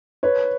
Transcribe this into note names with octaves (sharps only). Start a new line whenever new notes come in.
B4 C#5